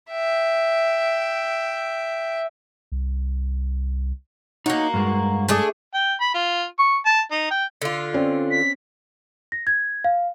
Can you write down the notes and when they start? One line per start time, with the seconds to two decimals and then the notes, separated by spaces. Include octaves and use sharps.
0.11 E5 G5
2.92 C2
4.66 A#3 D#4 F#4 C#5 D#5
4.94 G2 G#3
5.48 A3 D4 G#4
5.94 G5
6.21 B5
6.34 F4
6.79 C#6
7.06 A5
7.31 D#4
7.51 G5
7.82 D3 F4
8.13 C4 C#4 D5
8.51 B6
9.52 A#6
9.67 G#6
10.04 F5